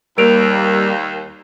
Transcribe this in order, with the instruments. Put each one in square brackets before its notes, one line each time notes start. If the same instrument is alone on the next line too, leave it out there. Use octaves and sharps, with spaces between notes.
[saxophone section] D#2 [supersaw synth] G3 A#3 [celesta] A#4 D7 F7